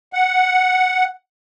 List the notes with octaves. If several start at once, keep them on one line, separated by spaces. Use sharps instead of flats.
F#5